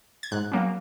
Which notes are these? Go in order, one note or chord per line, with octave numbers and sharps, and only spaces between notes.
G#6
G#2 F#6
F#3 A#3 C#4